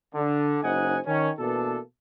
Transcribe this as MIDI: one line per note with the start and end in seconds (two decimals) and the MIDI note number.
0.14 0.58 50
0.63 0.98 30
0.63 0.98 63
0.63 0.98 72
0.63 0.98 75
0.63 0.98 78
0.63 0.98 80
1.06 1.30 51
1.06 1.30 61
1.39 1.79 47
1.39 1.79 52
1.39 1.79 58
1.39 1.79 62
1.39 1.79 69